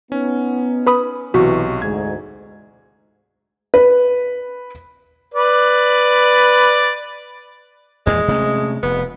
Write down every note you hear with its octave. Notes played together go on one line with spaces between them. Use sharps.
B3 C#4 D#4
B4 B5 D#6
B1 C3 E3 F#4 C#6
D2 G#2 G#3 G#6
B4
B4 D5
E2 A#2 E3 G#3
C3 A3 C#4
F1 B3